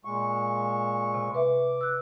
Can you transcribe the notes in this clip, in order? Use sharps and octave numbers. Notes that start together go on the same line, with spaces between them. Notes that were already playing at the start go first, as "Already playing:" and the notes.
A#2 G#3 C#6
C3
B4 E5 D6
E6 F#6